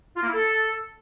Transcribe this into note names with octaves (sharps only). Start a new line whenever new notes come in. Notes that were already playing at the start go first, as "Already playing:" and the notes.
F4
A#3
E4
A4